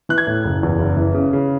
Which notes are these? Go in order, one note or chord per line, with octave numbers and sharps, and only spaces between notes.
E3 F#6
G#6
A2
F#1
E2
F#1
E3
C#3
C#3